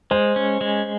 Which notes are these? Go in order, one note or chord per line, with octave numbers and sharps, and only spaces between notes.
G#3 C5
C#4
G#3